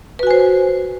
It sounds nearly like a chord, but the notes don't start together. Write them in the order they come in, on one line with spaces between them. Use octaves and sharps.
B4 F#4 G#5 C5